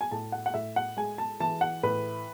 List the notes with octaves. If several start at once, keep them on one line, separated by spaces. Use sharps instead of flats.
G#5
A2 A5
F#5
F#5
A2 E5
F#5
G#3 G#5
A5
E3 A5
F#5
A2 B4